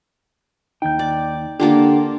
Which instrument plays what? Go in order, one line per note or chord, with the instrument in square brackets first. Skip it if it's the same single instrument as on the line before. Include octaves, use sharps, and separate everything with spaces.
[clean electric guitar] D#2 G5 [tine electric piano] D#4 G6
[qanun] D5
[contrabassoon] D3 [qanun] A#3 D4 F4 [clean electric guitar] G4 [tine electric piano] F#5 G5